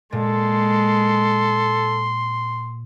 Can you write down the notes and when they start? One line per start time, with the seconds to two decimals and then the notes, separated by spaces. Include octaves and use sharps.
0.12 A#2 G#3 A4 C6